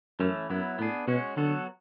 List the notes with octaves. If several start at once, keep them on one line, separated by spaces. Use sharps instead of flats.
F#2 E3 A3 C#4
F#2 F#3 B3 E4
A2 B3 D4 G#4
B2 G#3 C#4 F#4
D3 F#3 B3 F#4 A4